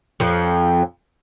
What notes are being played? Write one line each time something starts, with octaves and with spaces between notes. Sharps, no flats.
F2 F3